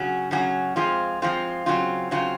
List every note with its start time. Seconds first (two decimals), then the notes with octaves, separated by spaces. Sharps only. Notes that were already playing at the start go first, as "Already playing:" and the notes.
Already playing: C#3 F#3 C#4 F#4
0.31 C#3 F#3 C#4 F#4
0.76 F3 G#3 C4 F4
1.22 F3 G#3 C4 F4
1.66 C#3 F#3 C4 F4
2.11 C#3 F#3 C4 F4